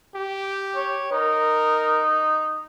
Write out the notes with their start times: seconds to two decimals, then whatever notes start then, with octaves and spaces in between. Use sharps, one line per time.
0.15 G4
0.76 C#5
1.12 D#4 A#4